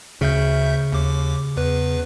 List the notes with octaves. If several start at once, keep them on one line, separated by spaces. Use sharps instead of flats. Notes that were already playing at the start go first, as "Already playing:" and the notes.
D2 C#3 E5 G6
D#2 D6
E2 B4